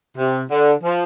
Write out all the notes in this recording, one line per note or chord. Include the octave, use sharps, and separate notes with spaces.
C3
D3
F3